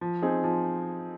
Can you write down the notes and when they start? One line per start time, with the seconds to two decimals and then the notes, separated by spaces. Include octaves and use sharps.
0.01 F3
0.22 C4 D#4 G#4
0.44 F3